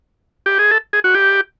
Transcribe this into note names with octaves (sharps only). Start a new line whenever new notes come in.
G4
G#4
A4
G#4
F#4
G4